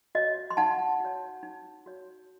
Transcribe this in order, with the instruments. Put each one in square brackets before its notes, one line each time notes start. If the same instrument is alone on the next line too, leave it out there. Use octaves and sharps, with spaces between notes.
[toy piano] F#4 C#5 D#5
C6
D#4 F#5 A5
F#4 C#5
D#4
F#4 C#5